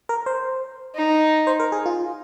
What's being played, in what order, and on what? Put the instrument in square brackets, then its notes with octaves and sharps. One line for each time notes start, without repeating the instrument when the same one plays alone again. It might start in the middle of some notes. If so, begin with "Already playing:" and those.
[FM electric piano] A#4
C5
[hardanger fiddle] D#4
[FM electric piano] C5
A#4
G#4
F4